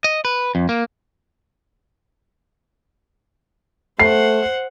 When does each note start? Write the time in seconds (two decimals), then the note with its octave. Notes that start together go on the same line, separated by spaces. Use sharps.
0.04 D#5
0.25 B4
0.55 F2
0.69 A#3
3.99 A3 C5 F#5 C7